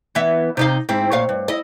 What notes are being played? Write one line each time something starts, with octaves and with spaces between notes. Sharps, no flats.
E3 B3 E5
C3 D#4 F5
G#2 C4 E4
A#2 C#5 F5
G2
E4 D#5